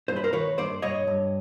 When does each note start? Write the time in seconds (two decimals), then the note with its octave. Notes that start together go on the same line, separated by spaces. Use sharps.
0.08 G2 C5
0.16 B4
0.24 A#4 C5
0.33 D#3 B4 C#5
0.58 G2 C5 D5
0.82 G2 C#5 D#5
1.07 G2